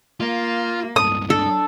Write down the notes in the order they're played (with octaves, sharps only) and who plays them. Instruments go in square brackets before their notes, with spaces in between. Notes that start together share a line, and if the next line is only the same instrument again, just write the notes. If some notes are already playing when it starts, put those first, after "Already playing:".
[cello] A#3 [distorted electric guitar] F4
[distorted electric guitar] C#2 G2 [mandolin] D#6
[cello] D4 [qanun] A4